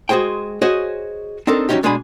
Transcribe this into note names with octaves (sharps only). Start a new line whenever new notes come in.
G#3 F#4 G#4 C5 G5
F#4 G#4 C5 C#5 D#5
C4 D4 D#4 A4 A#4
E3 F#3 A#3 C#4 D#4 G4
B2 G#3 D4 G#4 G#5 B5